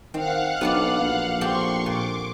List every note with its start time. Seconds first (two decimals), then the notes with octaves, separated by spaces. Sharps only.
0.14 D#3 C4 F5 F#5 F#6
0.61 B1 B3 D4 D5
1.01 A#1
1.41 C4 G4 A4 C6 C#6
1.86 A#2 D6